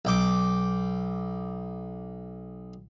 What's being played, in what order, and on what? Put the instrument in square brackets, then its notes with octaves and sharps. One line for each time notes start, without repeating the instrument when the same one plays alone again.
[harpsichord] B1 G5 D6